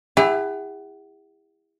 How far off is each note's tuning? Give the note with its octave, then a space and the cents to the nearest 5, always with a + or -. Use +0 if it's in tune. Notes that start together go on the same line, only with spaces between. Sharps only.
E4 +0 G#4 -45 F#5 +25